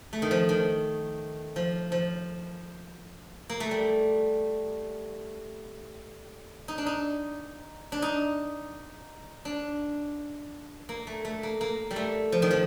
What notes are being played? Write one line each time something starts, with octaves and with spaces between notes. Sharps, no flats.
A3
D#3
F3
D#3
F3
F3
A#3
A3
G3
D#4
D4
D#4
D4
D#4
D4
A#3
A3
A3
A#3
A#3
G3
A3
F3
D#3
F3